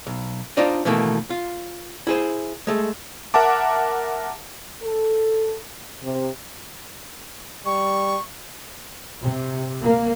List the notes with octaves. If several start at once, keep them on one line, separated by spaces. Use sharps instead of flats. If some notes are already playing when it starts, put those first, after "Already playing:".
B1
D4 D#4 F4 C5 D5 D#5
B2 D#3 E3 A3 A#3
F4
E4 G#4 C5
G#3 A3
A#4 E5 F#5 A5 D6
A4
C3
G3 C#6
C3
A#3